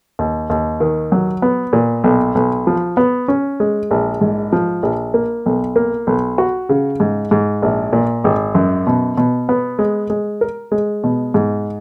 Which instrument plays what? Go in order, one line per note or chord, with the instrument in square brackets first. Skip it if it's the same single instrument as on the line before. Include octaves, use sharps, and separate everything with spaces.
[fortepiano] D#2
D#2
D#3
F#3
B3
A#2
B1
B1
F3
B3
C#4
G#3
A#1
G#2
F3
A#1
A#3
B1
A#3
B1
F#4
C#3
G#2
G#2
A#1
A#2
G#1
F#2
B2
B2
B3
G#3
G#3
A#4
G#3
B2
G#2